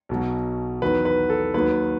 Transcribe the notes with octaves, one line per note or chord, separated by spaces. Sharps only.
B1 B2 F#3
E2 D#3 F#3 B4
B4
A4
D#2 D#3 F#3 B4